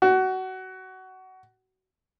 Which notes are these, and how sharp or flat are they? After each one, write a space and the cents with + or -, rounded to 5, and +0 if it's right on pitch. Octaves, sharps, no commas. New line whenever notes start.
F#4 +20